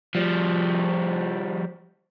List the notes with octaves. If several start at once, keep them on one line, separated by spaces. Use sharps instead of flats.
F3 G3